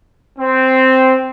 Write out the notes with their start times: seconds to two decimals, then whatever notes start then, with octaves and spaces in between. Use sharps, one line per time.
0.39 C4